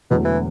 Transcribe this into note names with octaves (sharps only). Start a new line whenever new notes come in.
E1 E2 B2 D3 F#3 A3
E3